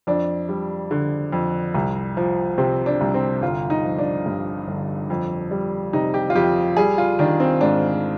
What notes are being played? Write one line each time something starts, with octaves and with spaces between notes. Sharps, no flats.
F2 D4
G3
D3
F2
C2
F3
C3 C4
D4
C2
C4
G1 F4
D#4
F3
D4
G2
G1
F2
G3
C3 D#4
G4
F4
F2 G4
G3 G#4
F4
D#3 D4
C4
G#2 D4